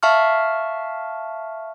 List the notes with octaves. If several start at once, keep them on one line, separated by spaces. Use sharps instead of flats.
E5 F5 A5 C#6 F6